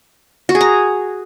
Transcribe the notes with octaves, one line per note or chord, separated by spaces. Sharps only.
F#4
G#4
A#5